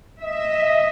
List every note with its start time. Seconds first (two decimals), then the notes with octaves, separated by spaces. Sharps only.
0.23 D#5 E5